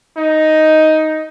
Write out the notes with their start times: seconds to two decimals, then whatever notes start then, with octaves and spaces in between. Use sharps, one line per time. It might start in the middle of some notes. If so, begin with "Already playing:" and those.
0.17 D#4